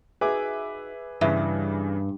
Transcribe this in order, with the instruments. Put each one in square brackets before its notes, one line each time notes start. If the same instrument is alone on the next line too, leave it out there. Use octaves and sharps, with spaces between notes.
[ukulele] D#4 F#4 [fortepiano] G#4 [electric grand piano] B4 E5 D6
[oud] G2 [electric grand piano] C#3 E3 [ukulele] E5